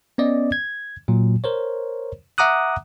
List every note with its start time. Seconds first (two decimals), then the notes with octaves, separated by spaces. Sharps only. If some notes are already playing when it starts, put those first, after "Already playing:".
0.18 B3 C#4 D5 D#5
0.52 G#6
1.08 A#2 F#3
1.44 A#4 C5 C#5
2.38 E5 F#5 A#5 D6 D#6 F#6